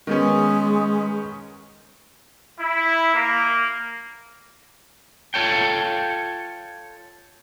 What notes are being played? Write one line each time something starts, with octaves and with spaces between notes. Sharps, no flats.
D#3 G#3 B3 C#4
E4
A#3
F4 A4 C#5 G5